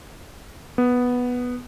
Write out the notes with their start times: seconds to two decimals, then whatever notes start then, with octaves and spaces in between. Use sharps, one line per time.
0.78 B3